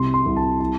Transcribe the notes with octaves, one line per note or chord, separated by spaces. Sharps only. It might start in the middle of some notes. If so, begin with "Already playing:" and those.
Already playing: C2 C3 C6
C6
C2
A5
A5